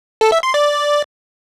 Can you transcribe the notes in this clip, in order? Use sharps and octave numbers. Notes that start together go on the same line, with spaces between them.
A4
E5
C6
D5